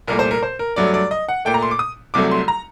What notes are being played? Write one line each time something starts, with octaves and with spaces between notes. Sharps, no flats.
C2 A#2 A3 A#4
C5
A#4
C5
A#4
G2 F#3 A3 D5
D5
D#5
F#5
A#2 A3 G5
A#5
C6
D6
D#6
C2 C3 F#3 A3 D6
C6
A#5